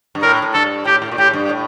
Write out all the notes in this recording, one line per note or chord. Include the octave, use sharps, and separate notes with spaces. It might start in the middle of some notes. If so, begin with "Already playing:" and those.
G2
A2 A#4
A2
G2 A4
A2 G4
A2
A#2
A2 G4
G2
A2